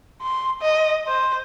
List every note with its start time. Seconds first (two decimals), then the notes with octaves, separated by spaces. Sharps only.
0.22 C6
0.61 D#5
1.07 C5